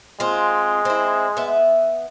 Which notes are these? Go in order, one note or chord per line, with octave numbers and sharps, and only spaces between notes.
G#3 C4 F4
C4 E4
B3 E5